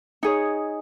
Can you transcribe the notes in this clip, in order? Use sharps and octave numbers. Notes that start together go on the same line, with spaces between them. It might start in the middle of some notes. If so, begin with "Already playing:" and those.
D#4 G#4 C#5